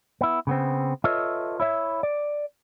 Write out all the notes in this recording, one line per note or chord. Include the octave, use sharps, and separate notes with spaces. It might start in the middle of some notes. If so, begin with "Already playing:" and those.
B3 E4
C#3 B3 C4
F4 A4 B4 C#5 D#5 E5
E4 C#5 E5
D5